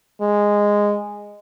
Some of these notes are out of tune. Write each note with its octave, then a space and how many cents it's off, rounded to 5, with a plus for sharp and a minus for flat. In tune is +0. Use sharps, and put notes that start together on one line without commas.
G#3 -10